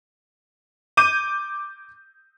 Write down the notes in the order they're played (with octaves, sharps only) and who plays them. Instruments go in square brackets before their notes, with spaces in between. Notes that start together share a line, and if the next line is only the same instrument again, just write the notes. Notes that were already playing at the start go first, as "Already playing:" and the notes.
[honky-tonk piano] D6 G6 D#7